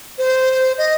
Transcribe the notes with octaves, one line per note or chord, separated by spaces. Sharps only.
C5
D#5